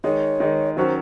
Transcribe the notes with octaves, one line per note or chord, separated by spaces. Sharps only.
D#3 G#3 D#4 C#5
D#3 G#3 D#4
D#3 F#3 C#4 F#4 C5